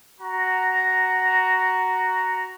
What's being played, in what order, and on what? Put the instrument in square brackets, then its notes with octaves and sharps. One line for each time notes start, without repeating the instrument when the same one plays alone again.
[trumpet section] F#4 A#5